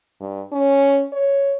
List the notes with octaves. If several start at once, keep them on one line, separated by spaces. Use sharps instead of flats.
G2
C#4
C#5